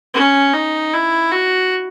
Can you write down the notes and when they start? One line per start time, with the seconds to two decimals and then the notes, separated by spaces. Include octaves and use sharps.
0.14 C#4
0.53 D#4
0.93 E4
1.31 F#4